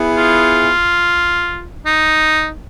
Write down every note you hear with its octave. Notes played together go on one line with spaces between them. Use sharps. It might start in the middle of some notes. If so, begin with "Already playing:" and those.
Already playing: B3 E4 G#4
F4
D#4